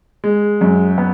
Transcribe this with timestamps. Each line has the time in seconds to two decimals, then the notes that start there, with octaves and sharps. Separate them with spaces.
0.24 G#3
0.61 F#2
0.98 B3